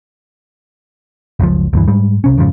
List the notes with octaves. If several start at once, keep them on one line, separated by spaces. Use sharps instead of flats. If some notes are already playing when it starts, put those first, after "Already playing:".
F#1 C#2 F3
D2 G2 E3
G#2 G3
C2 C3 C#4
F2 G#2 C#3 F3